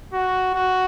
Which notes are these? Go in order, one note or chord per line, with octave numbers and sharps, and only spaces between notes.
F#4
F#4